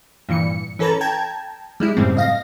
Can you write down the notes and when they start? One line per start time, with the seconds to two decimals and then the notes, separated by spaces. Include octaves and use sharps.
0.29 G2 A#2 E3 C#7
0.79 E3 C#4 A4 B4 A#5 A6
1.01 G5 A5 A#5 G#6
1.80 G3 G#3 E4
1.97 F#2 A2 C#3 G3 C4
2.17 D#5 F5 A#6